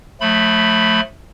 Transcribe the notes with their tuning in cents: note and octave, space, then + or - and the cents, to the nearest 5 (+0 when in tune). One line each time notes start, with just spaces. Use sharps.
F3 +45 A3 -5 B5 +10